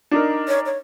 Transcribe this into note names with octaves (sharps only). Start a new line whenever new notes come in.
D4 D#4 A#4
C#5
C#5